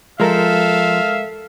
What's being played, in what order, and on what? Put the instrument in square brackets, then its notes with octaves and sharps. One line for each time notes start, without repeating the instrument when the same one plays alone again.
[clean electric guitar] F3 [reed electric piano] G#3 A#4 [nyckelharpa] A4 [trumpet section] E5 F5